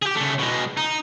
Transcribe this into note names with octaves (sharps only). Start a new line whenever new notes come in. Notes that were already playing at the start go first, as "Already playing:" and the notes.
G4 G#4
C#3 A3
B2 G#3
D#4